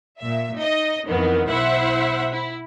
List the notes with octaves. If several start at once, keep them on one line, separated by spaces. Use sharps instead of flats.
A#2 E5
D#4 D#5
F2 D#3 E3 B3
B1 E4 C5 E5 F#5
E4